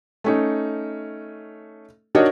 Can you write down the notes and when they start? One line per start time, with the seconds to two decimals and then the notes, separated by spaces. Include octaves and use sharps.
0.24 A3 C#4 D#4
2.15 D4 D#4 F#4 A#4 C#5 D#5